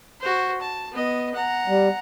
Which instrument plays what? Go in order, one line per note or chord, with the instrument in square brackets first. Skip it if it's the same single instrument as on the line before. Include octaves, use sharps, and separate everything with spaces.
[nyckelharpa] F#4 C5
A5
B3 D#5
F#5 A#5
[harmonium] G3